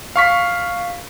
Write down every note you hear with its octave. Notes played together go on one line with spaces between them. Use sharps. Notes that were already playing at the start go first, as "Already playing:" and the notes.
F5 C#6 B6